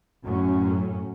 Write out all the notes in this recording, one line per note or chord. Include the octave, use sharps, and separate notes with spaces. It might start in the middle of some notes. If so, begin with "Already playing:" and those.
F#2 A2 F#3 C#4